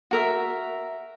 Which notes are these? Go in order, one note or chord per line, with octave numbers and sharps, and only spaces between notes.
F#4 A#4 E5